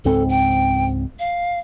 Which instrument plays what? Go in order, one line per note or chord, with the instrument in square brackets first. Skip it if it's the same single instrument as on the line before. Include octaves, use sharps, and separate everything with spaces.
[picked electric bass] C#2 G#2 C4 [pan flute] A4
[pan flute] G5
F5